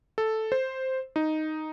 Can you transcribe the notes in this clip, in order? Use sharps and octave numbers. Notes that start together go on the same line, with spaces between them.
A4
C5
D#4